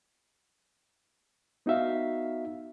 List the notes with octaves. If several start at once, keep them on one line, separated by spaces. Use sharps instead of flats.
B3 D#4 F#4 E5 F5